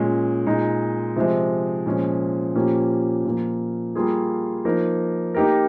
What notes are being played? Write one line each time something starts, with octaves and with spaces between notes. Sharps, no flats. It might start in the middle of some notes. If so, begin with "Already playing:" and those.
Already playing: A#2 G#3 C#4
A#2 G#3 D#4
C3 F3 G#3
A#2 F3 G#3 C#4
A#2 F3 A#3 C#4 G4
A#2 F3 A#3
G3 A#3 F4 G#4
F3 A#3 D#4 A#4
A#3 D#4 G4 A#4